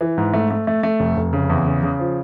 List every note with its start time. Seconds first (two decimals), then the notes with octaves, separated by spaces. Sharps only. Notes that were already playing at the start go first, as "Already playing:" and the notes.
0.01 E3
0.18 G#2
0.34 A3
0.50 A3
0.67 A3
0.83 A3
1.00 F1
1.17 F1
1.33 C#3
1.49 E2
1.66 C#3
1.83 C#3
1.99 F3